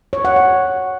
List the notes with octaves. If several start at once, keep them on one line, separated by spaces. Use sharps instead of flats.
C#5
F#5
C#5